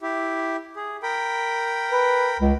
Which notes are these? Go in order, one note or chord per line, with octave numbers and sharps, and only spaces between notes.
E4 G4
G#4
A#4 G5 B5
B4
C#2